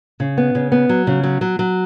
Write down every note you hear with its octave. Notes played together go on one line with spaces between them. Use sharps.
C#3
B3
C#3
B3
F#3
C#3
F#3
F#3
F#3